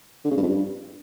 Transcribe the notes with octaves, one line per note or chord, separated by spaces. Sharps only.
D3
C#3
G2
F2
G2